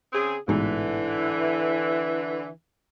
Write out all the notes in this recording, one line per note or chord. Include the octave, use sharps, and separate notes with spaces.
C#3 C4 G#4
A1 G#2 B2 D3 E3